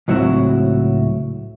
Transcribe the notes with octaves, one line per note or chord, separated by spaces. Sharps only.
C#2 A2 F#3 C4 E4 F#4